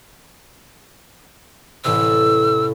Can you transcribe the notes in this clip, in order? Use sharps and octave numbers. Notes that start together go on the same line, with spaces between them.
A1 A2 C3 E6